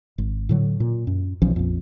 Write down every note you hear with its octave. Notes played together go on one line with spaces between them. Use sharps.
G#1
A2 D3 F#3
A#2
F#2
B1 E3 F3 C#4
A#1 F2